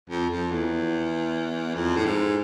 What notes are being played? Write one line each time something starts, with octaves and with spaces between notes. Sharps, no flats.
F2
F2
E2
F2
A2
G#2